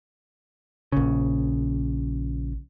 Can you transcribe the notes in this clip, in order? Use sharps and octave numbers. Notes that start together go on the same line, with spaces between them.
A#1 C#3